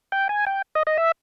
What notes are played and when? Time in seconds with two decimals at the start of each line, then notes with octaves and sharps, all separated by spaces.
0.12 G5
0.29 G#5
0.46 G5
0.75 D#5
0.87 D#5
0.98 E5